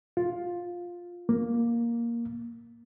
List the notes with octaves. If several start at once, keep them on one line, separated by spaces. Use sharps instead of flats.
F4
A#3